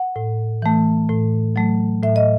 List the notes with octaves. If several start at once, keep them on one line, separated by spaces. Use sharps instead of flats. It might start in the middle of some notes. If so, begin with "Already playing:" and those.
Already playing: F#5
A2
E3 A3
A2
F#3 A3
A2 E5
D#5